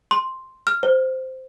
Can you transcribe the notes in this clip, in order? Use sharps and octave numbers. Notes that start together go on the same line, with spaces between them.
C6
F6
C5